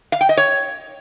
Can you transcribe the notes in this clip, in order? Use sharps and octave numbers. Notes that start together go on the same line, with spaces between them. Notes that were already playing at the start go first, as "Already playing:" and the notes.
F5
G5
D#5
C#5